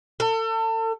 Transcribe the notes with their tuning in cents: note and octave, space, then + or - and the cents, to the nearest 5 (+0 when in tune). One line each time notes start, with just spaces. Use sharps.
A4 +35